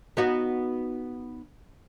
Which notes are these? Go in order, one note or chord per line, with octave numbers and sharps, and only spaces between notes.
B3 D#4 F#4